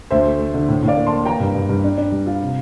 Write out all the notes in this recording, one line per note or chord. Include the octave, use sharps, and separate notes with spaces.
D2 C5 E5
A3
A3
D3
A2
A2
D5 F5
A#3
A5 C6
A#3
E3 G5 A#5
G2
G2
G2
D4
D4
G3
F4
C3